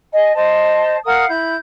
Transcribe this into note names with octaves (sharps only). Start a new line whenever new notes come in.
D#5 G#5
C5 D#5 A5
A#4 F5 F#5 D#6
E4 G6